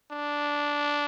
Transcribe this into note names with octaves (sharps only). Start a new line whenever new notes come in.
D4